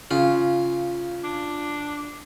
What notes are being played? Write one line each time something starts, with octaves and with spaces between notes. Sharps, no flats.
C#3 F4
D4